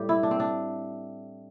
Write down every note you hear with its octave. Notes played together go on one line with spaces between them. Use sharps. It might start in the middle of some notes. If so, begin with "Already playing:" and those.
Already playing: A2 G3 G4
E4
D4
C4
D4